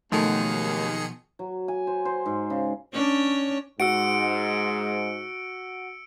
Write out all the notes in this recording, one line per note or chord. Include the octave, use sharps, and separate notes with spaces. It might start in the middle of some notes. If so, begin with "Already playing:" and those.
D#2 B2 D#3 F3 F#3 A3 G#4 C#7
F#3
G#5
C5
C5
G#2
C#3
C#4 D4 C#5
G#2 F#4 E6 C#7 D7